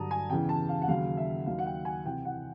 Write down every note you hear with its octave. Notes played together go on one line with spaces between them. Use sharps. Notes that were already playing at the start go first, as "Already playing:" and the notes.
Already playing: G2 D3 F#3 A5 A#5 D#6
G#5
E2 C#3 E3 G5
A5
F5
F#5
D#2 C#3 F#3 F5
E5
D#2 D#3 F#3 F5
F#5
G5
G#5
C2 C3 E3 G5
F#5